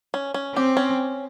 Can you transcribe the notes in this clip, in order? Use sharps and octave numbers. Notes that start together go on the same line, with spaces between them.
C#4
C#4
C4 G4
C#4